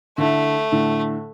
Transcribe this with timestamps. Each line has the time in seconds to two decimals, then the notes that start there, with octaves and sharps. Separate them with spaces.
0.18 D3 A3 E4
0.72 A2 D3